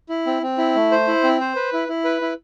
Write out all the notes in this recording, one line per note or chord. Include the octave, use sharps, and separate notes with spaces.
E4
C4
C4
E4
A3
C5
E4
C4
C5
B4
E4
E4
B4
E4